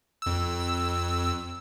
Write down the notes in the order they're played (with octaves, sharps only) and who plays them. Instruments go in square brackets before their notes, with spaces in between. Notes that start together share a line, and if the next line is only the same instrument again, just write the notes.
[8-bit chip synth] F2 E6